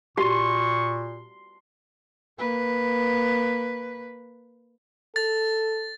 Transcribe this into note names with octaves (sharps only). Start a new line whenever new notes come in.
A#2 F#4 G4 C6 C#6
A#3 B4
A4 A6